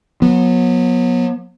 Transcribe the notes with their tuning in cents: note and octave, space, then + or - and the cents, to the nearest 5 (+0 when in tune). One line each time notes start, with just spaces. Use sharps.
F#3 -35 B3 -25